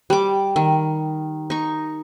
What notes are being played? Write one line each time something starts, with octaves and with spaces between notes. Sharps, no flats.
G3 D6
D#3
D#4 C#6